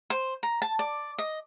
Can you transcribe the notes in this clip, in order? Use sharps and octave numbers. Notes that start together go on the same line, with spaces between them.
C5
A#5
A5
D5
D#5